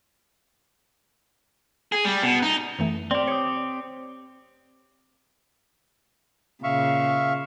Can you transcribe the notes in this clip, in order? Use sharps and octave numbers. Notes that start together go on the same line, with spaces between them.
G#4
G3
B2
D#4
F#2 E3 A3
C4 G4 D5 C6 F6
C#5 D#6 C#7
A#2 C#3 E5 F5 C#6